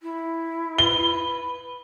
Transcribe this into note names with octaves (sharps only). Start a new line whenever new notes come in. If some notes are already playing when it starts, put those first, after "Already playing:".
E4
B4 G7